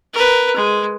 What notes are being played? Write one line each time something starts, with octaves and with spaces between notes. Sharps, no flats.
A#4 B4
G#3